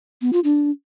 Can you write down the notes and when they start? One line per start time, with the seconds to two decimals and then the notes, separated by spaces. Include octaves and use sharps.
0.22 B3
0.33 F4
0.44 D4